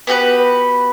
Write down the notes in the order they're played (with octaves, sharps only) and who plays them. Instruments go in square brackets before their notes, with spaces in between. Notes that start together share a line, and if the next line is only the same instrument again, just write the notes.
[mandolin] B3 F#4 G4 B4